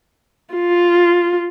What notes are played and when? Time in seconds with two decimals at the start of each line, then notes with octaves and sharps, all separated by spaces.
0.55 F4